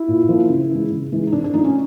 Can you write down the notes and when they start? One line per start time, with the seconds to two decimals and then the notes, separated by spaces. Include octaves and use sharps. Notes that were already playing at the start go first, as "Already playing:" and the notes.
Already playing: E4
0.08 A#2
0.29 F3 A#3
0.49 C#3
0.71 E3 G#3
0.91 C#3
1.12 E3 G#3
1.27 D#4
1.32 C3 D4
1.44 D4
1.53 F3 A3 D#4
1.64 C#4